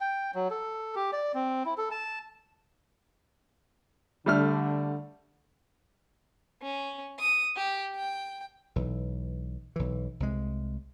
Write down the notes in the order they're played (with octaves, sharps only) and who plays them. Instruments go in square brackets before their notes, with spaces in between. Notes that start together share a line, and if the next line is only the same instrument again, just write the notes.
[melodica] G5
F#3
A4
G4
D5
C4
E4
A4
A5
[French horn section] D3 [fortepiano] G3 A3 F6
[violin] C#4
D#6
G4
G5
[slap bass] B1 E3
B1 E3
C2 G#3